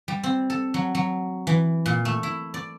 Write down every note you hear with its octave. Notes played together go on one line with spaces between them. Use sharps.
G3
C4
A4
F#3
F#3
E3
A#2
A3
E4
D5